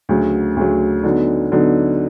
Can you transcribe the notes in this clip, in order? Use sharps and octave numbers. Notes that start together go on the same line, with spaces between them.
D2 C#3 F#3
D2 C#3 F#3
D3 F#3 B3 D#4
D3 F#3 B3 D#4